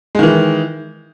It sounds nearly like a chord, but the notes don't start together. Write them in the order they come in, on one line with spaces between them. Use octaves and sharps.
G#3 D#3 E3